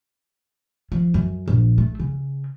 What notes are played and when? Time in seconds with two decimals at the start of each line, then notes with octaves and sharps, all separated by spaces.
0.92 F3
1.14 F#2
1.48 A#1
1.78 A3
2.00 C#3